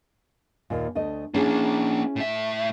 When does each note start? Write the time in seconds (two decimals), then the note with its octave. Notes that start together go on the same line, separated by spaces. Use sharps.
0.70 D#2 A#2
0.95 D2 A3 D#5
1.34 A#3 C#4 D4 E4 G#4
2.16 A2 E5